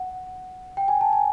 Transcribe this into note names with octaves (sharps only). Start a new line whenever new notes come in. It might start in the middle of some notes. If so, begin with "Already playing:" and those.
Already playing: F#5
G5
G#5
A5
G#5